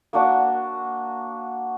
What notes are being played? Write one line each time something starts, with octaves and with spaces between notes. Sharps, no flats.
A#3 D4 F#4